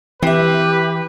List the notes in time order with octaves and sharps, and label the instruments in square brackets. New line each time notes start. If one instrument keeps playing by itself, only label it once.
[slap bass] E3 [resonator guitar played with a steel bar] C4 E5 [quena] G4 [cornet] B4